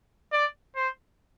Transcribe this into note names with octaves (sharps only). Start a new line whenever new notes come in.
D5
C5